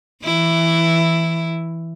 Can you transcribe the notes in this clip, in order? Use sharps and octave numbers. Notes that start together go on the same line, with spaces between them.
E3 E4